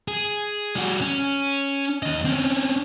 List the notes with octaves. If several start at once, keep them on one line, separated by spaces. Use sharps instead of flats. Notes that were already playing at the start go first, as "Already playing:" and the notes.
G#4
G3 F#4
C#4
D#2 D#5
C4 C#4